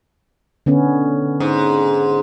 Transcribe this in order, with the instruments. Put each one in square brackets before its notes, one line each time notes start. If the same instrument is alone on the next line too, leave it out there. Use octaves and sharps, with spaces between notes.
[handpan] D3 B3 C#4
[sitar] G#2